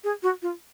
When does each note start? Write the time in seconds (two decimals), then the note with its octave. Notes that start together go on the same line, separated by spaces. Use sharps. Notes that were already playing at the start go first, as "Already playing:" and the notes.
0.04 G#4
0.23 F#4
0.42 F4